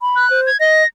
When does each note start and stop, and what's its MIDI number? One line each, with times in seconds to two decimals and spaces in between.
0.01 0.28 83
0.16 0.40 90
0.30 0.50 72
0.46 0.59 92
0.60 0.83 75
0.60 0.87 94